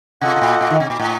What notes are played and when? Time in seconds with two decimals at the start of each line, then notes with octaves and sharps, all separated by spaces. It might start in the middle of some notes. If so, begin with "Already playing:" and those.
0.21 C3 F4 A4 D#5 F#5
0.36 C3
0.41 A#2
0.61 A#2
0.70 D#3
0.80 C3
0.90 A#2
0.99 A2